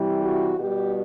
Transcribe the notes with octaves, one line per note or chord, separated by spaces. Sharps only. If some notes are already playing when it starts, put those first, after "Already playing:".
Already playing: C3 E3 G3
F#4
B2 G3 G4